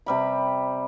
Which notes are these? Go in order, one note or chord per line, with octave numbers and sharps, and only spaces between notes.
C3 G3 B5